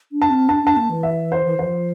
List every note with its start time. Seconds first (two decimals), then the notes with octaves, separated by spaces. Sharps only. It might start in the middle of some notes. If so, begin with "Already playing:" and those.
0.12 D4
0.22 A5
0.30 C4
0.48 D4 A5
0.63 D4 A5
0.77 A#3
0.90 E3
1.03 E5
1.32 C5
1.45 E3
1.59 F3 C5